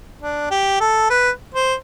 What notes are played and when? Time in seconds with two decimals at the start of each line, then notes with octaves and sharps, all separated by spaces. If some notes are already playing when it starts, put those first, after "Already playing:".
0.22 D4
0.51 G4
0.81 A4
1.10 B4
1.54 C5